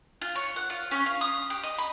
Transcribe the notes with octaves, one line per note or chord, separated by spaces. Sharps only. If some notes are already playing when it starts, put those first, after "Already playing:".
F4
C#5
F#5
F4
C#4
F5
D#6
G4
D#5
B5